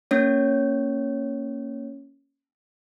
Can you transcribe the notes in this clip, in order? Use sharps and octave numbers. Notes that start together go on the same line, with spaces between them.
A#3 C#4 C#5